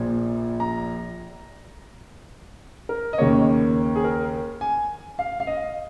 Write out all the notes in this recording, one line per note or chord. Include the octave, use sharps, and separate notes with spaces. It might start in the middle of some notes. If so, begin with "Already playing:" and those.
Already playing: A#1 A#2 F3
A#5
A#4
D#5
D#2 C#3 A#3 C#5
G#4
A#4
G#5
F5
F5
D#5